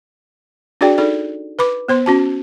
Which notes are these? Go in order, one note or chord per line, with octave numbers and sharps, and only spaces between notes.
D4 F#4 G#4 D5 G5
D#4 A4 D5
B4 B5 D6
B3 C5 C6
C#4 F#4 A5